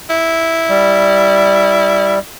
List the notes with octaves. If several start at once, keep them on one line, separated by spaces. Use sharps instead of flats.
E4
G3